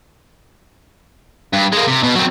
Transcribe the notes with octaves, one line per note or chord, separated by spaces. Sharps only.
G2
G#3 A#3
C3
B2
F#3 C4